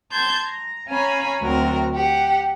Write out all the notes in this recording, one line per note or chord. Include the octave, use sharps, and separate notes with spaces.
A5 C6 G6 G#6
A#5
C#4 F5 G#5 A#5 B5
D2 F#3 C4 A#4
G4 F#5